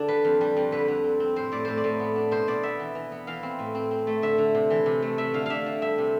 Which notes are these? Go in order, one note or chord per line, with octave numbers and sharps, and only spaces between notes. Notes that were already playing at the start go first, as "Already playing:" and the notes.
Already playing: D3 D4
G3 B4
F2
G3
F2
D3 B4
D3
C4
C4
A2 C5
A2 D5
A2 C5
D5
A2
B3
D4
B2 C5
B2 D5
B3 E5
E3
E3
B3
E3 F5
C4
A2
C4
C4
A3
D3 E5
D3
C3
E3
C3
A3
A3 E5
D3 F5
D4 E5 F5
D3
G3 E5
C3